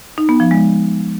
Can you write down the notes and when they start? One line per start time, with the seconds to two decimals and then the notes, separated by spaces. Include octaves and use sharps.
0.18 D#4
0.29 B3
0.40 F3
0.51 G#3